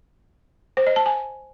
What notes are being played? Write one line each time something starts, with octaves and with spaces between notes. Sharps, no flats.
C5
D#5
A5
G#5